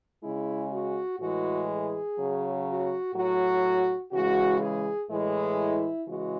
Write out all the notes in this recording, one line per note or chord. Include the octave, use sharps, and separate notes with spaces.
C#3 G#3 E4
F#4
A2 E3 G#3 F#4
G#4
C#3 F#3
F#4
A2 F#3 F#4
C#3 E3 G#3 F#4
G#4
A2 E3 G#3
E4
C#3 E3 G#3 F#4